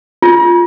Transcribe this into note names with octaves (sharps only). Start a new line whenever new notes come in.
F4